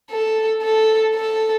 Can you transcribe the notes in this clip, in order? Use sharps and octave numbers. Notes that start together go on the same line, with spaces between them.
A4
A4
A4